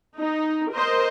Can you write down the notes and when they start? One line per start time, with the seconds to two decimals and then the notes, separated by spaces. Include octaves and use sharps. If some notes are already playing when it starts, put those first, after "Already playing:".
0.18 D#4
0.72 A#4 C5 D#5